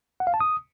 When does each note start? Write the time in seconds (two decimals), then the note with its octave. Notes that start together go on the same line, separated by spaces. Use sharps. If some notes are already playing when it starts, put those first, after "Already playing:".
0.20 F#5
0.27 F5
0.34 A5
0.40 D#6